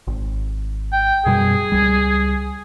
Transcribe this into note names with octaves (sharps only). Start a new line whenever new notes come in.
G#1
G5
F#2 B2 G3 G#4
C#2 G3